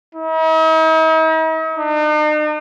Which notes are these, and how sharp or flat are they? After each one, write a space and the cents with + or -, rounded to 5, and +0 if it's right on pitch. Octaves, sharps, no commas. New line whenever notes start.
D#4 +45
D#4 -45